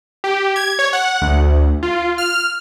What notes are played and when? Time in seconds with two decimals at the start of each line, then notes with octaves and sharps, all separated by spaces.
0.24 G4
0.56 G#6
0.79 C#5
0.93 F#5
1.22 D2
1.83 F4
2.18 F6